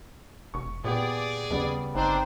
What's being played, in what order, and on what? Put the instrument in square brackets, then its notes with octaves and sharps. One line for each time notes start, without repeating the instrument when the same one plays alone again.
[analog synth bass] F1 [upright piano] C#6
[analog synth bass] A#2 [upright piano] B3 G4 [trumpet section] G#4 D5
[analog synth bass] D#2 [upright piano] C#3 G3 B3
[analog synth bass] G1 [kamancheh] C4 D#4 [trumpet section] D4 C5